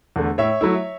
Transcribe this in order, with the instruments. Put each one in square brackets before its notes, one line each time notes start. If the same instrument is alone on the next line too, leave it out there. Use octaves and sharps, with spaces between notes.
[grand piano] E2 D3 A3
A2 C#5 E5
F#3 A3 E4